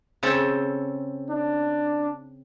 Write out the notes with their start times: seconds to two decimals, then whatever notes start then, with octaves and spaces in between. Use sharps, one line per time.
0.23 C#3 C4 A4
1.30 D4